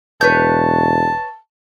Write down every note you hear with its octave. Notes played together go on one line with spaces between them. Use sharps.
E1 B4 C#5 A5 G6